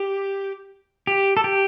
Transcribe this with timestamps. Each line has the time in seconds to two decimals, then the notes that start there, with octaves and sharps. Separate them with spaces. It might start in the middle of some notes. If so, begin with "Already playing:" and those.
Already playing: G4
1.07 G4
1.37 A4
1.44 G4